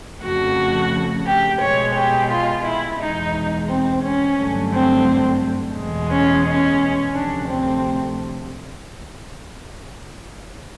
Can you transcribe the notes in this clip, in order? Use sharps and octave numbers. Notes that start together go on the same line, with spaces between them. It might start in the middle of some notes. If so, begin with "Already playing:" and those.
F2 C#3 F3 A3 F#4
G4
B2 G#3 C#5
G4
F4
E4
E2 B2 G#3 D#4
C4
C#4
G2 D3 F#3 A3
C4
E2 B2 G#3
C#4
C#4
D2 C3 F3 A3 D4
C4